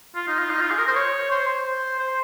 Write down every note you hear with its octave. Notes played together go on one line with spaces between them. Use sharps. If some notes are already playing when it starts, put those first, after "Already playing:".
F4
D#4
F4
D#4
F4
G#4
A#4
C5
C#5
C5
C5
C5